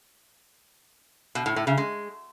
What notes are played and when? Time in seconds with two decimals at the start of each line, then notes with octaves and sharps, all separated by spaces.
1.35 B2
1.46 A2
1.56 A2
1.67 C#3
1.78 G#3